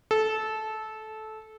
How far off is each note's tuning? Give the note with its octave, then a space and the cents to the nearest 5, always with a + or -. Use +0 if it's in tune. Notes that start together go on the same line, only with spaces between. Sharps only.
A4 -15